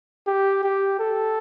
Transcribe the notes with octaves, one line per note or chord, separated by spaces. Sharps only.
G4
G4
A4